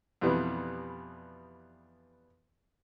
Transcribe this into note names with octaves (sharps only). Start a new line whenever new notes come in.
F2 B2 E3 G3 B3